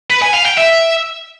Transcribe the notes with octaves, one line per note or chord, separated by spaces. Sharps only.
B4
G#5
F5
G5
E5